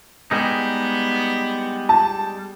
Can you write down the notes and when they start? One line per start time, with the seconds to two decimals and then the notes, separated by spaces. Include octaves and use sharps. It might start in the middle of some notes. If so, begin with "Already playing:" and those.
0.31 G3 G#3 B3 D#4
1.89 A5